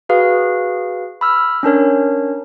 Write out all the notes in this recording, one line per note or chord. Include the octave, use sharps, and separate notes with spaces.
F#4 G#4 B4 F5
B5 E6 F6
C#4 D4 A#4 C#5